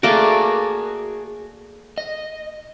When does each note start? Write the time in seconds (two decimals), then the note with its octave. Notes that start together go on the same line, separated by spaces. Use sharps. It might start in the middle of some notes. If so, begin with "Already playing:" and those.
0.03 A3 A#3 F#4 G#4 D5
1.98 D#5